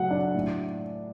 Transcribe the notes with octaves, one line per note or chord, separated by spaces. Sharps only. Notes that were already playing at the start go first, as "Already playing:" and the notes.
Already playing: F#3 A3 F#5
D4
A2